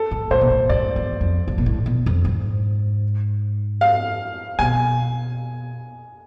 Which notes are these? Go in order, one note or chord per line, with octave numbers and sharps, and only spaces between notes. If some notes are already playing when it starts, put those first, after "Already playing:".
Already playing: A4
G#2
A2 C5
B2
A2
G#2 D5
E2
F2
G#2
B2
A2
B2
F2
G#2
F5
B2 G#5